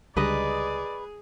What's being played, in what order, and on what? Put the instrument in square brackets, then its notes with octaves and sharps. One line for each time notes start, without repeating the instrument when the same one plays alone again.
[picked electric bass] C#2 D3 G3 [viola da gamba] G#4 [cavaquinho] B4 D#5 A#5 [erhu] D5